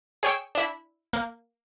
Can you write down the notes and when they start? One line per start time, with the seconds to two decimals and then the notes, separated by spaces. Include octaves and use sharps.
0.23 G#4 C#5 G5 C#6 E6
0.55 D4 E4
1.13 A#3